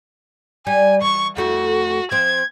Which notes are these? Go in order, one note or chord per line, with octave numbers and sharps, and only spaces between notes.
G3 G#5
E3 C#6
F2 A3 E4 F#4
F3 C4 G#6